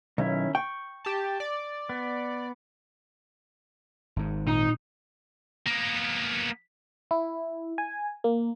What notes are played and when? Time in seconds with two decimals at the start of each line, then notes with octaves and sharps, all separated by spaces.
0.18 B1 D#3 C#4 E4
0.55 G5 C#6
1.05 G4 A5
1.40 D5
1.89 B3
4.16 G#1 G#2
4.47 A#2 D#4
5.67 A#3 B3
7.11 E4
7.78 G#5
8.24 A#3